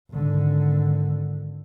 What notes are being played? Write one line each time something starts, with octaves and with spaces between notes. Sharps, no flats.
G#1 D3